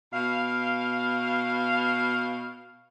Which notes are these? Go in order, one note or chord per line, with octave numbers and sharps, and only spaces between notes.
B2 F5